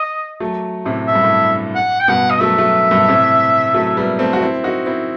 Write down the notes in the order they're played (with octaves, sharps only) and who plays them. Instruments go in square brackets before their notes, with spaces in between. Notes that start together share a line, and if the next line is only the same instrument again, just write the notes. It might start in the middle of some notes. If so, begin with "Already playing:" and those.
Already playing: [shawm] D#5
[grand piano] F#3 A3
A2 C3
[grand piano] A2 [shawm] E5
[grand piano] G2
A2
[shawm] F#5
G5
[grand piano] G2 B2 [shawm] F#5
[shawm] D#5
[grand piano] F#3 A3 [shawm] E5
[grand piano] F#3 A3
G2 B2
A2 C3
F#3 A3
G3 B3
A3 C4
F#4
C4 E4
D#4 F#4
C4 E4